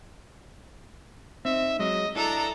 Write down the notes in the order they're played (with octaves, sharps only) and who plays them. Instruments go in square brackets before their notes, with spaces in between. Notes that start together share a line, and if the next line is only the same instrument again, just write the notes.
[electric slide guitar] C4 D#4 [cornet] E5
[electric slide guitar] F#3 G#3 [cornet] D#5
[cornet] D4 [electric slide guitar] E4 [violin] A4 A#5